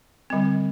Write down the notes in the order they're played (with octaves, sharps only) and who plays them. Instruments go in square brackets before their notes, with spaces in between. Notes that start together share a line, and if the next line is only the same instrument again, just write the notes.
[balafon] D3 G3 C4